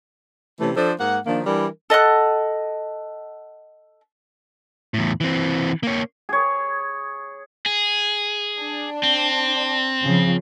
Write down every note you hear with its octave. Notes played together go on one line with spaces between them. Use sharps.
C3 E3 A3 C#4
F3 D4 A4 C5
G#2 A#3 F#5
D#3 F3 A#3 D4
E3 G3 D4 A#4
A4 D#5 F#5 F#6
E2 A2
E3 C4
A#3 C#5
G#4 C#5
G#4
D4
C4
C#3 F3